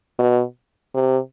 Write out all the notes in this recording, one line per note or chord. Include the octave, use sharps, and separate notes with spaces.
B2
C3